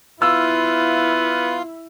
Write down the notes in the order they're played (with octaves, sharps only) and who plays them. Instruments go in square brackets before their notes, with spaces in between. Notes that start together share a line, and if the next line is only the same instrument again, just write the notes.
[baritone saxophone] B3 [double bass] E4 [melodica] F4 F5 [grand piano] E6